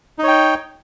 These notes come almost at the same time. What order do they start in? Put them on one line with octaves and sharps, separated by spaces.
D#4 C#5 G5